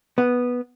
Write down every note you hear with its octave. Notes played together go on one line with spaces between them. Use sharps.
B3